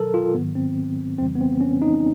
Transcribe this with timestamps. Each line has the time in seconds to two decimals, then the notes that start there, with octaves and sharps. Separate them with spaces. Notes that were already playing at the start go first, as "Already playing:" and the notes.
Already playing: B2 F#3 A4 A#4
0.14 F4
0.34 G#2 D#3 F#3 B3
0.55 C4
1.19 F2 C#3 E3 G3 C4
1.36 B3
1.41 C4
1.61 C#4
1.82 D#4